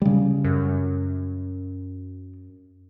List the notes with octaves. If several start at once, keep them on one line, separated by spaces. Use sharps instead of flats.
C#3 G3
F#2